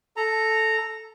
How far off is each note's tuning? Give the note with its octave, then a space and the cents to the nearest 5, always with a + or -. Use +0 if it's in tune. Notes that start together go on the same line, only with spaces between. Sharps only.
A4 +0 A#5 -10